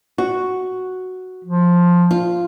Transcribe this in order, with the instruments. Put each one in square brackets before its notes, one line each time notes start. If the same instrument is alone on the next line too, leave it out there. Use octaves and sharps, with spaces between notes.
[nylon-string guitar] F#4
[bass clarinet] F3
[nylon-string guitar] F4